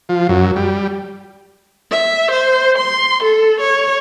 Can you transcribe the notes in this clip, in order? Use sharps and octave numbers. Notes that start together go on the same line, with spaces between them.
F3
F#2
G3
E5
C5
C6
A4
C#5